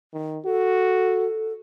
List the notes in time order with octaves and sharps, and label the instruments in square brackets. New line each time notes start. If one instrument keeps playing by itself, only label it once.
[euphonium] D#3
[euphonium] F#4 [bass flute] A4